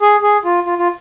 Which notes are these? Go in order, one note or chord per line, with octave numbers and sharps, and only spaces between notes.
G#4
G#4
F4
F4
F4